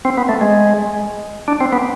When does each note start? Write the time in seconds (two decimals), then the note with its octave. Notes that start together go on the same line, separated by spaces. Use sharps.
0.05 C4
0.18 B3
0.29 A3
0.41 G#3
1.48 D4
1.60 C4
1.73 B3